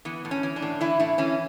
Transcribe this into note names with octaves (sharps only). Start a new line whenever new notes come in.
E3 B3
A2
C#4
E3
D4
A2
E3 E4
A2 E4
E3 C#4